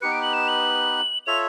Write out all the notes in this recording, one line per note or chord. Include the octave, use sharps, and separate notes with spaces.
B3 D#4 G4 B4 C#7
D7
F#7
E7
F#7
F4 A4 C#5 E5 F7